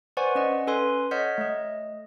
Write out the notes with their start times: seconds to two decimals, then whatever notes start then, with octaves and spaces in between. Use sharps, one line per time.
0.17 B4 C5 D5 F#5 G#5 C#6
0.35 C#4 D#5 F#5
0.67 C#4 A4 B4 G#5 C6
1.11 C#5 D#5 F#5 F6 G6 B6
1.38 A3 D#5